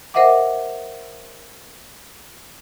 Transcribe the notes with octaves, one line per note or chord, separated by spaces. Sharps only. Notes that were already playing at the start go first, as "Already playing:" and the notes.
A#4 C5 D#5 E5 F#5 D6